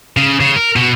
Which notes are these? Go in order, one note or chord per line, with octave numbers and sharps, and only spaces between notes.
C#3
C#3
A#4
B2